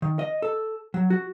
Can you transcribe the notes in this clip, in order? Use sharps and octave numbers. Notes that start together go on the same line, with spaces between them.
D#3
D#5
A4
F#3
F#4